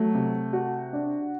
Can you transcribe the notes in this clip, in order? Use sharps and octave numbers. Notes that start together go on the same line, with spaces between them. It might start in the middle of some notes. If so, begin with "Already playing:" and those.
Already playing: F#3 A3
C3
F#4
D4